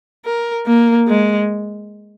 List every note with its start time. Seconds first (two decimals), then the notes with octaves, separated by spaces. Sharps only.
0.25 A#4
0.67 A#3
1.08 G#3